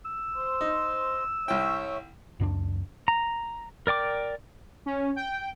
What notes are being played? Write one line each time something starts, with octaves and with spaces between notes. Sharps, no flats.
E6
C5
D#4
C2 C#5 E5 G5
C#2 F#2 F#3 D4
A#5
A#4 D5 G5 D6
C#4
G5